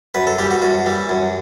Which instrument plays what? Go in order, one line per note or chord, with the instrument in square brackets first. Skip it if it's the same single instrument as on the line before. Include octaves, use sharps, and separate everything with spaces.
[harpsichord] F#2 B4
A4
E3 G3 G4
F#4
F#2 F#4
E3 G3
F#2